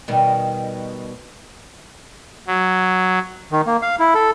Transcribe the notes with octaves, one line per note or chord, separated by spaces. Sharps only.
B2 D#3 G3
F#3
D#3
A#3
F5
E4
A4